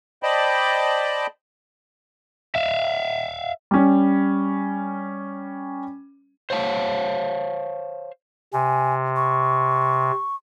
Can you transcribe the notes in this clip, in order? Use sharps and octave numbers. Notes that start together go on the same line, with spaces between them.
C5 D5 D#5 G5 A5 B5
E5 F5
G3 C#4
C5 C#5 F5 A5
C3 G#5
C#6